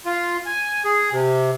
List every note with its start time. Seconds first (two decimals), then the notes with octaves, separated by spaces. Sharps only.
0.06 F4
0.46 G#5
0.85 G#4
1.13 C3